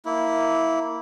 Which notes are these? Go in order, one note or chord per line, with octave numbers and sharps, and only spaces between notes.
A#3 E4